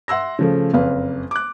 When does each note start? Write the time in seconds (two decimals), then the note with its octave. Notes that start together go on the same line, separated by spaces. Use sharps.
0.08 E5 F#5 C6 E6 A#6
0.39 C#3 F3 A3
0.74 F#1 F2 B4 F5
1.31 D6 F#6